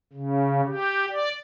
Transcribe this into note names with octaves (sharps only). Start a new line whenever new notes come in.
C#3
G4
D5